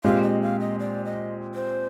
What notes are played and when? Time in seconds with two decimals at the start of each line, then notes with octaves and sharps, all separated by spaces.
0.04 A#2 G#3 C4 G4 F5
0.23 D#5
0.42 F5
0.60 D#5
0.79 D5
1.05 D#5
1.55 C5